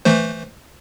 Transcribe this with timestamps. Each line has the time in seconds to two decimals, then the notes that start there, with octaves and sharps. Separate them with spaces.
0.05 E3 A3 C5